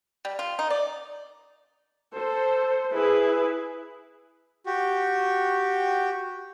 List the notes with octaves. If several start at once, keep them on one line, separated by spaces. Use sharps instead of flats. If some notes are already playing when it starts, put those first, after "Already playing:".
G3
F4
D#4
D5
A4 C5
E4 G#4 B4
F#4 G4